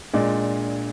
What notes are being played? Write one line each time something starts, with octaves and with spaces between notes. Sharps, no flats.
A#2 G#3 D4